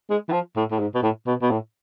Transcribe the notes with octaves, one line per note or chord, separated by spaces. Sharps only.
G#3
E3
F3
A2
A2
G#2
B2
A2
B2
B2
A2